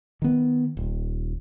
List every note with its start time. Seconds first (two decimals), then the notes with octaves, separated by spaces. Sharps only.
0.22 D#3 B3
0.77 D#1